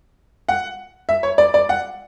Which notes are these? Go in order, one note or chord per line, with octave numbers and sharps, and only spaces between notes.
F#5
E5
C#5
D5
D5
F#5